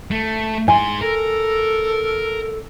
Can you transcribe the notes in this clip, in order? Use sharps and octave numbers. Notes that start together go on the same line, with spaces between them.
A3
G#2 G#5 C6
A4 A#4